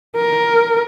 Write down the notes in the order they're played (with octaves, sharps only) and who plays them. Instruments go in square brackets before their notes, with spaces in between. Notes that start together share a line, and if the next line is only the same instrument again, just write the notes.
[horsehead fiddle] A#4